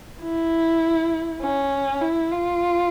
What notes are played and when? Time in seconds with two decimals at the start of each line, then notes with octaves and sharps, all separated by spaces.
0.21 E4
1.41 C#4
2.01 E4
2.32 F4